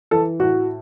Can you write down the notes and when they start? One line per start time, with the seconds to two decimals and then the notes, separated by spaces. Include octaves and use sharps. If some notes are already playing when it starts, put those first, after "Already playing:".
0.11 E3 A4
0.40 A2 F#4